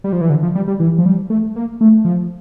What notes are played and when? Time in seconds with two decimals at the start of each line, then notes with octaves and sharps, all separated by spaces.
0.04 G3
0.13 F3
0.21 E3
0.30 D3
0.43 F3
0.55 G3
0.68 G3
0.80 E3
0.98 F3
1.06 G3
1.30 A3
1.56 A#3
1.81 A3
2.05 F3